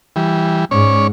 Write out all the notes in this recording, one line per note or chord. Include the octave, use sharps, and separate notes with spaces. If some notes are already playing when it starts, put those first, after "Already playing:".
E3 G3
G#2 C#4 C#5 D5